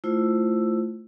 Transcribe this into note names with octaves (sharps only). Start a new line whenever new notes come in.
A3 E4 F4 C5 E6